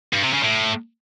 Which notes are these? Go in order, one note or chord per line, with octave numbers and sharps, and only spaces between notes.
G2
C3
C#3
A2